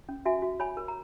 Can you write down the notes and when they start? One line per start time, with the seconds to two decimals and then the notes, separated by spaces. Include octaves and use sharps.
0.09 C#4
0.25 F#4 E5 G#5
0.42 F#4
0.60 C#5 G#5 B5
0.77 A#4
0.88 A#5